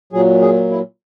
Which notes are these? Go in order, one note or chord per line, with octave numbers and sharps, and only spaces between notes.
A#2 F#3 G#4
G#4
E4